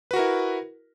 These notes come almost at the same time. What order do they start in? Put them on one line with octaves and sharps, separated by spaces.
B4 F#4 A#4 E4